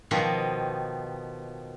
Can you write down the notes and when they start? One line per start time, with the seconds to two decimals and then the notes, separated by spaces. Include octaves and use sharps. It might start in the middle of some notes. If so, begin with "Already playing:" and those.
0.11 B2 D#3 F3 G4